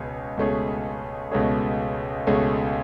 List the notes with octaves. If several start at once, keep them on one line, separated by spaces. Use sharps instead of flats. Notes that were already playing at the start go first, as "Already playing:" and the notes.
Already playing: C#2 B2 C#4 G#4
C#2 B2 A3 C#4 G#4
C#2 B2 A3 C#4 G#4
C#2 B2 A3 C#4 G#4